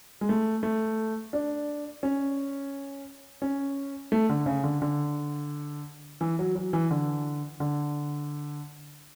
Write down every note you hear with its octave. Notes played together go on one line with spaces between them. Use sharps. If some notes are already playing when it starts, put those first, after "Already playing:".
G#3
A3
A3
D4
C#4
C#4
A3
D3
C#3
D3
D3
E3
F#3
F#3
E3
D3
D3